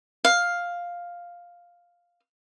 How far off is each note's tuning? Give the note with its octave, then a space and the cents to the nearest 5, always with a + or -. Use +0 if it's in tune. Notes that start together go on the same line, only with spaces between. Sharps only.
F5 +5